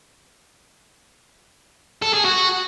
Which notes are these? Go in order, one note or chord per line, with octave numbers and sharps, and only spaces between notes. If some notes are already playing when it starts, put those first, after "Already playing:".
A4
G#4
F#4